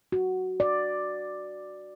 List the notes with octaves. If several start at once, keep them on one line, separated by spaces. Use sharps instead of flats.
F#4
D5